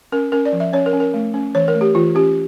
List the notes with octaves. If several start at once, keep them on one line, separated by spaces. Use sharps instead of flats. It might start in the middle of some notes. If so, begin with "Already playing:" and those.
C#4 A#4
C#4 A#4
D5
F3
E5
C#4 C#5
A#4
C#4
A#4
A3
C#4
E3 C#5
A#4
A3
G4
E3 F4
C#4 G4